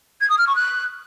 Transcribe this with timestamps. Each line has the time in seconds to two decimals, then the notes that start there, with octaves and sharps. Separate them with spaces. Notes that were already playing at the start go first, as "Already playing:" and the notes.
0.21 G#6
0.30 D#6
0.38 F6
0.47 C#6
0.56 F#6